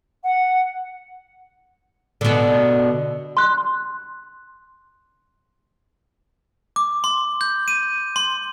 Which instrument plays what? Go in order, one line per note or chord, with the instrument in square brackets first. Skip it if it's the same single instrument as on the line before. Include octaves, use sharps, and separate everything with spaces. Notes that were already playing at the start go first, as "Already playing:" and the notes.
[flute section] F#5
[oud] B2 D3
[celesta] C6 F#6
[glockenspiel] D6
C6
G6
D#7
C6